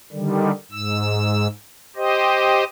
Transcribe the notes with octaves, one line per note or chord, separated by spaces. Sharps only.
D3 D#3 G3
G#2 E6
G4 C5 D#5